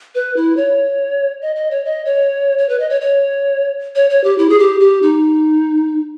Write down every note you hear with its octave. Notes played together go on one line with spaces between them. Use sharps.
B4
E4
C#5
D#5
D#5
C#5
D#5
C#5
C#5
B4
D#5
C#5
C#5
C#5
C#5
G4
E4
G#4
G4
G4
D#4